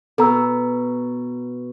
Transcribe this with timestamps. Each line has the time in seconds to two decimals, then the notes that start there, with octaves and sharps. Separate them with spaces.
0.18 B2 A4 A#5 E6